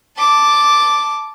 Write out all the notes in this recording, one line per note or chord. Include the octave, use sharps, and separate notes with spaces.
A5 D6